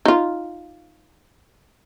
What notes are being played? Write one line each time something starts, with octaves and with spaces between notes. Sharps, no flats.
D#4 F4